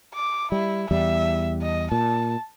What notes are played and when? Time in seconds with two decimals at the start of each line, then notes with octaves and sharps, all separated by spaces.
0.14 D6
0.52 G3 E4
0.91 E2 G3 E5
1.62 D#5
1.92 A#2 A5